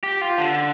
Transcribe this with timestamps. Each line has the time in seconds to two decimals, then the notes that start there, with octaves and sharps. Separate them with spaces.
0.03 G4
0.21 F4
0.38 D3